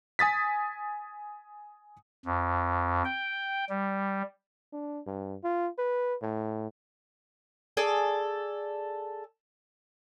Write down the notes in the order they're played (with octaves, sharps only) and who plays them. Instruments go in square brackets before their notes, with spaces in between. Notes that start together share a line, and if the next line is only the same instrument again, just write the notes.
[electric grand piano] G#5 D#6 A6 B6
[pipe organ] F2
G5
G3
[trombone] D4
G2
F4
B4
A2
[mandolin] G#4 A4 D5